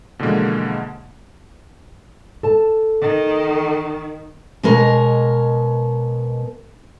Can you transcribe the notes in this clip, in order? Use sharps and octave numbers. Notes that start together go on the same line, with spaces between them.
B2 D3 E3 F3 G#3 A#3
A4 A5
D#3
B2 G#3 A#4 C#5